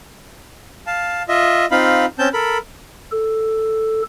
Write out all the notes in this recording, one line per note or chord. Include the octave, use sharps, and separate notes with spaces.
F5 A5
F4 D#5 E5
C4 D#4 F4 F5 B5
C4 C#4 A5 G6
A4 A#4 B5
A4